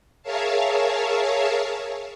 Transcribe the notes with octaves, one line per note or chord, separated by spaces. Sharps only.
G#4 A#4 C#5 E5 F5 A5